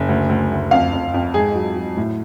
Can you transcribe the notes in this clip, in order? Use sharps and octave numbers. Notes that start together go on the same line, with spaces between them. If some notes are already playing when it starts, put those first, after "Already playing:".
Already playing: F#1
D2
D2
D2
F2 F5
F2
F2
G#2 G#4
F#3
F#3
A2